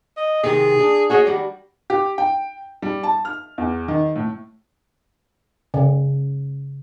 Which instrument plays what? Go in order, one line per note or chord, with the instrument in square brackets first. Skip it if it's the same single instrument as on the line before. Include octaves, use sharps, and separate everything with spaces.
[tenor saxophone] D#5
[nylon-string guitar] C3 D#3 [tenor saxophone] G#4
[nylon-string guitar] D4
[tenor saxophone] F#4 [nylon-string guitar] G#4 C#5 D#5
[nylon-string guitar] D#3 G3 F#4 [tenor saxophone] D4
[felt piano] G4
G5
G3
A5
F6
E2
D#3
A2
[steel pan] C#3